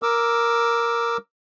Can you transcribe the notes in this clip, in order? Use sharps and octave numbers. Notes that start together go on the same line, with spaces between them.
A#4 D6 E6